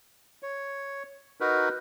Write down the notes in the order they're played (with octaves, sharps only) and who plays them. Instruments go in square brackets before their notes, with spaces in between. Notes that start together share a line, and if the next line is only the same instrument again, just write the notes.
[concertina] C#5
D#4 F#4 A#4 B4